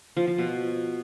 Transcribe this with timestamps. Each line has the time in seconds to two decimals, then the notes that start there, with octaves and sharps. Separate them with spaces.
0.17 F3
0.27 F3
0.38 B2